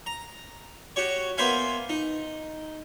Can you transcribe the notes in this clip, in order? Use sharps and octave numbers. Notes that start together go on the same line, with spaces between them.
A#5
F#4 G4 C#5
A#3 B3 C5 E5 F5 G#5
D#4